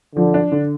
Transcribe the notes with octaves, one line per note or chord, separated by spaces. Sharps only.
D3 F3
D4
D3